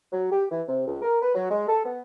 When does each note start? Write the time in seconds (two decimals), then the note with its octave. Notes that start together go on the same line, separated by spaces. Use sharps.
0.12 F#3
0.30 G4
0.51 E3
0.68 C3
0.87 C#2
1.02 A#4
1.22 B4
1.35 F#3
1.50 G#3
1.68 A4
1.85 B3